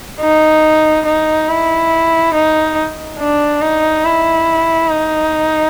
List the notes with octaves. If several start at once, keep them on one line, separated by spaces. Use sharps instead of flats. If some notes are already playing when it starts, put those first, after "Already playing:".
D#4
D#4
E4
D#4
D4
D#4
E4
D#4